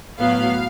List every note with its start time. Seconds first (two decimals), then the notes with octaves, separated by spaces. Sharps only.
0.19 A2 F#3 B3 F5